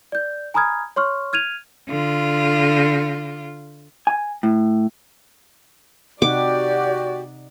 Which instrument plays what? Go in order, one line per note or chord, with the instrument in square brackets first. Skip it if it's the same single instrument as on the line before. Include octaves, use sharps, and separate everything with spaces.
[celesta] D5 G6
G#5 A#5 B5 D#6 F6 G#6
C#5 C6 C#6 F6
F6 G#6 D#7 F7
[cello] D3 F4
[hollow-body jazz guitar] G#5
A2
[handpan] C3 D#4 F#5 [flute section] F#4 G4 [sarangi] D5 [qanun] D6